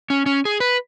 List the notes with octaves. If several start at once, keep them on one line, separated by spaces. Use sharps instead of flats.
C#4
C#4
G#4
B4